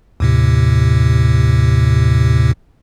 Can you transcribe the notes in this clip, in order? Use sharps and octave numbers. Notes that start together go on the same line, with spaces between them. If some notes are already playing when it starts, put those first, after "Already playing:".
D#2 A2 C3